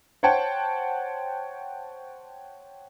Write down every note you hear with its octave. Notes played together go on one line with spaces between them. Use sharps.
C5 C#5 F#5 G5 A5